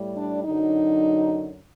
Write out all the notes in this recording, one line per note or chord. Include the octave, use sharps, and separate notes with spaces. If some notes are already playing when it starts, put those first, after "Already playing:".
Already playing: A2 G3
D4
F#2 D3 F#3 D#4